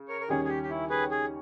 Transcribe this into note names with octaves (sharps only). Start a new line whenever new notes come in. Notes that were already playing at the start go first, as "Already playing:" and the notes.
Already playing: C#3
A#4 C#5
A#4
D#2 D#3 G3 C#4 G#4
G#4
G4
G4
E4
G#4 B4
G#4